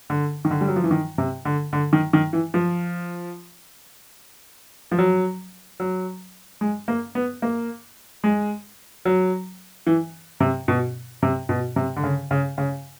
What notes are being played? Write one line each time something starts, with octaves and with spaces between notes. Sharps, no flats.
D3
D#3
D3
G3
F#3
F3
E3
D#3
C3
D3
D3
D#3
D#3
E3
F3
F3
F#3
F#3
G#3
A#3
B3
A#3
G#3
F#3
E3
C3
B2
C3
B2
C3
D3
C#3
C#3
C#3